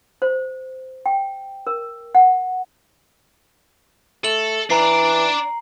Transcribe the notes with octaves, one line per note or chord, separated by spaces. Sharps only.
C5
G5
A#4
F#5
A3 A4 F#7
E3 D4 D5 A#5 C7